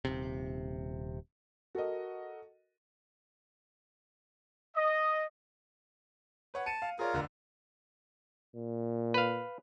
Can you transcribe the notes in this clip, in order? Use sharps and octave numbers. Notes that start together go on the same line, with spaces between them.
D#1 C3
F#4 A4 A#4 D#5
D#5
B4 C#5 F#5
A5 C#7 D#7
F5
F4 G#4 A#4 C#5 D5
F1 D3
A#2
B4 F5